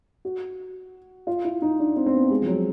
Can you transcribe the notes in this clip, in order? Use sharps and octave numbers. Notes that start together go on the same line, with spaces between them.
F#4
F4
E4
D#4
D4
C4
C4
B3
G#3
F3
F#3